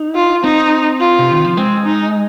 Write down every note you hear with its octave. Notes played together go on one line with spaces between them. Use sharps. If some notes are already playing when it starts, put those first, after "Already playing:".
Already playing: D#4
F4
C4 D#4
F4
C3
D#3
F3
G#3 C4
D#4